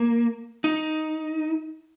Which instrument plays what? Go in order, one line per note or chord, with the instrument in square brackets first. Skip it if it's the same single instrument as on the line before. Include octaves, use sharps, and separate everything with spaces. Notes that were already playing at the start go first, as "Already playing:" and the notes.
Already playing: [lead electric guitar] A#3
D#4